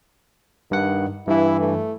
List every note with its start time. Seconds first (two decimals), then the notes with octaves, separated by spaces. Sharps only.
0.71 G2 D#3 F#5
1.27 G2 E3 E4
1.60 A3